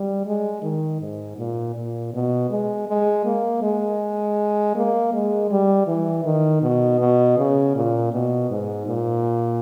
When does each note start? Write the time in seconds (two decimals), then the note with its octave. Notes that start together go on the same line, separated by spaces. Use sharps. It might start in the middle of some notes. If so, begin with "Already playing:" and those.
Already playing: G3
0.26 G#3
0.63 D#3
1.01 G#2
1.38 A#2
1.75 A#2
2.13 B2
2.50 G#3
2.88 G#3
3.25 A#3
3.63 G#3
4.75 A#3
5.13 G#3
5.51 G3
5.87 E3
6.25 D#3
6.62 B2
7.00 B2
7.38 C#3
7.75 A#2
8.13 B2
8.50 G#2
8.87 A#2